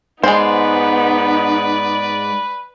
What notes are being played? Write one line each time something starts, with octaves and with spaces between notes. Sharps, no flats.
G#2 G#3 B3 D#4 G#4 B4 C5 D5